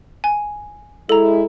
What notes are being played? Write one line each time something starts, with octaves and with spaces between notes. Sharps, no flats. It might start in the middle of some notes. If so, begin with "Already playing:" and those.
G#5
G#3 E4 A4 A#5